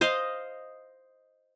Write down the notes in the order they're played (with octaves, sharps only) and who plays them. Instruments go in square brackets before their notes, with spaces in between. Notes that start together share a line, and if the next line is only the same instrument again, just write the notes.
[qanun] C5 D#5 F5 C6